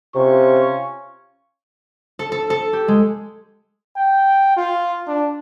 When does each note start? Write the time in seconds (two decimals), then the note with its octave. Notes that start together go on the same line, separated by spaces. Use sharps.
0.15 C3 C#4 F4 C#6
2.19 A4
2.32 A4
2.50 A4
2.73 G4
2.88 G#3
3.96 G5
4.57 F4
5.08 D4